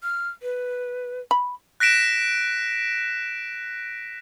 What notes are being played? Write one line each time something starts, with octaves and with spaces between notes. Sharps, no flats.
F6
B4
B5
F#6 A#6 B6 D7 E7